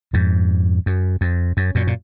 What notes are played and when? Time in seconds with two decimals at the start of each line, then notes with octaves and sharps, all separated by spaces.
0.13 F2 G#2
0.86 F#2
1.21 F2
1.57 F#2
1.75 F#2 A#2
1.87 A#2